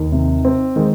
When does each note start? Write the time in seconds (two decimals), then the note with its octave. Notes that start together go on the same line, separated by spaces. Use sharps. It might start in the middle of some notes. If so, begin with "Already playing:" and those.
Already playing: D#2 D#4
0.12 C3
0.45 C4
0.76 D#3 G#3